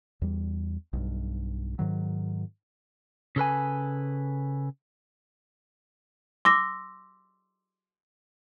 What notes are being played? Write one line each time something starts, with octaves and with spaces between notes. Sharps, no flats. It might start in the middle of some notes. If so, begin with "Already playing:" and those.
E2 G3
B1 G2
G#2 D#3 F#3
C#3 A4 B4 G#5
C6 D6 E6 A#6